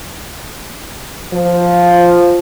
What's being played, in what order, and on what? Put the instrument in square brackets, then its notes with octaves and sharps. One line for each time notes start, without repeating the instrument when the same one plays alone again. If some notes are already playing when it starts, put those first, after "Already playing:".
[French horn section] F3